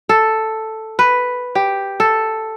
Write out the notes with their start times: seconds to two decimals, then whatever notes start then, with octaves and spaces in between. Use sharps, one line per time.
0.09 A4
0.99 B4
1.55 G4
2.00 A4